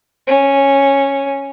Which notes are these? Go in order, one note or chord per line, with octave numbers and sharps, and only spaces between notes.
C#4